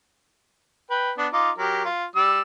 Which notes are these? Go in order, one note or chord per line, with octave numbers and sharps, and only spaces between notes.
B4 G5
B3 D4
D#4 F4 D6
F#3 G4 A#4
F4
G3 D5 E6